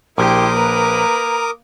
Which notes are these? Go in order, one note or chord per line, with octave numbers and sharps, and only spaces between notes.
A#1 E4 G4 A#4 C6 D6 D#6
A#3 B4 A#5